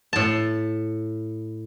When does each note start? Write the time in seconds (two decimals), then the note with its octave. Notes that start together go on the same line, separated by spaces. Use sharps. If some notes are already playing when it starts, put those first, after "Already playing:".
0.13 A2 A5